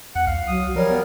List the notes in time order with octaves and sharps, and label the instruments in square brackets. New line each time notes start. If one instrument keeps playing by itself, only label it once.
[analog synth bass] E2 [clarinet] F#5
[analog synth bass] C2 [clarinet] F5
[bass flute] F#3 [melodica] D#6
[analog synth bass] F3 [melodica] G3 A#4 [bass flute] C#5
[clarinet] B3